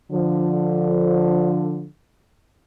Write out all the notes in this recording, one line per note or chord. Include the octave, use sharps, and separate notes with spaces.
D3 F3